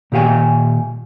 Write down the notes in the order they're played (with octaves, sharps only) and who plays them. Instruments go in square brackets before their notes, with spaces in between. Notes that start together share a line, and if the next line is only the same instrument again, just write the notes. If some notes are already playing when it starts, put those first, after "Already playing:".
[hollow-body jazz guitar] A#2 D#3 G4 F5 G#5